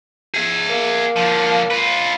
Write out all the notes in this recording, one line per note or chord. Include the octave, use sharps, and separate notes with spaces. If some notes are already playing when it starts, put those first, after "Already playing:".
G#4 E5
A#3
D3 F3
F4 B4